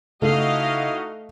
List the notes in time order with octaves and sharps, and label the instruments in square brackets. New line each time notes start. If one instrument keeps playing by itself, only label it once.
[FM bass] C#3 [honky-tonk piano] A3 [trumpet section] D#4 E4 F#4 [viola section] D#5 F5